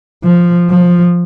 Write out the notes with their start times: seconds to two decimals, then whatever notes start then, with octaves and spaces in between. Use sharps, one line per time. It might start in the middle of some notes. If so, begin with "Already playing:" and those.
0.24 F3
0.70 F3